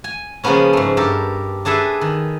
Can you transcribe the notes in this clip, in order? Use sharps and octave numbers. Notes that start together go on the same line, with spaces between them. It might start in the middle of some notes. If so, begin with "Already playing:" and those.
G#5
C#3 F3 G#3 A#3 B3 C#4
G#2 A3
G2 G4 A4 A#4
D4 G#4 A4 B4 E5
D#3